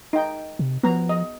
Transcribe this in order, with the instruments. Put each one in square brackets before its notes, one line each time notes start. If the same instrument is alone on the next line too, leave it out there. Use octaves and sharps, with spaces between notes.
[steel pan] D#4 G5
[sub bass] C3
[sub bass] F3 [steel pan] B3 A#5
[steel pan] D#5